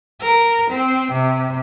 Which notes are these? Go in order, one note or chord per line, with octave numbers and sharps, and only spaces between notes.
A#4
C4
C3